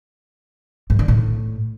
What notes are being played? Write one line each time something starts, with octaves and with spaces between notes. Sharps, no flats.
G#2
D3
A2